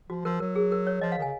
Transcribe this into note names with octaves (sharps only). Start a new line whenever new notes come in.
F3 F#4
F3 A#4
F#3 A#4
G#4
A#4
C#5
F3 D#5
F5
D#3
C#3 G#5